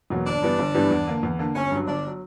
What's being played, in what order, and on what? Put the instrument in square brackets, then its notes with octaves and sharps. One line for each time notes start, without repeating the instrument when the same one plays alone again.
[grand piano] E2 B2 F#3 A#3
[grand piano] G1 [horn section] D4
[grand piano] G2 E3 G3 B3
G1
G2 E3 G3 B3
E2
D3 A#3
E2
D3 A#3
[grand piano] G1 [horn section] C#4
[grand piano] G2 F#3
[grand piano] G1 [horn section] D4
[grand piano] F#3